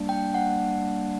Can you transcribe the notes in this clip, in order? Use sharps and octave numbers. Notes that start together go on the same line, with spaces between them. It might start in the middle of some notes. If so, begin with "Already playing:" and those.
Already playing: G3 A#3 D4
G5
F#5